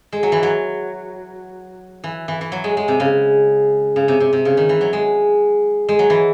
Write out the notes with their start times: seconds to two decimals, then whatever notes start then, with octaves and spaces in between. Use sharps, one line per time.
0.13 G#3
0.23 F#3
0.32 E3
0.43 F#3
2.04 E3
2.28 E3
2.41 E3
2.52 F#3
2.64 G#3
2.77 G#3
2.88 C3
3.00 C#3
3.96 C#3
4.08 C3
4.20 C3
4.33 C3
4.45 C#3
4.57 D#3
4.69 E3
4.81 F#3
4.93 G#3
5.89 G#3
5.99 F#3
6.10 E3